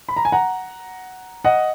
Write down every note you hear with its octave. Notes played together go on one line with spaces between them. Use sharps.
B5
A#5
G#5
F#5 A#5
D#5 F#5